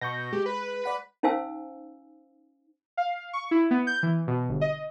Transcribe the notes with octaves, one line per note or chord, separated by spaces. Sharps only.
B2 C#6 G6 A#6
G#3 G4
B4
D5 F#5 B6
C#4 D#4 C5 F5 G#5 E6
F5
C#6
E4
B3
G6
E3
B2
G1
D#5